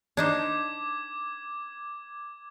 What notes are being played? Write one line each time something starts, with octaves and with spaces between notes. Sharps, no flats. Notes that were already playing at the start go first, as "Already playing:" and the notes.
D4 D#4 C5 D6 G#6